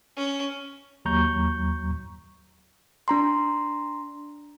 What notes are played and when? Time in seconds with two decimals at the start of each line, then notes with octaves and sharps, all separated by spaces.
0.17 C#4
1.05 D#2 F#3 A#5 C#6 G6
3.08 D4 A#5 C6